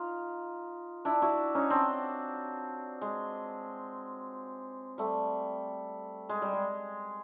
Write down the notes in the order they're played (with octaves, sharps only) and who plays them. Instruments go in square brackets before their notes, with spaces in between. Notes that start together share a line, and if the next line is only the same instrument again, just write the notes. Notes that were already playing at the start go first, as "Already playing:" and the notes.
Already playing: [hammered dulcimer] D#4 F4
D4 E4
E4 F#4
C#4 D#4
C4 D4
G#3
G3 A3
G#3
G3
G#3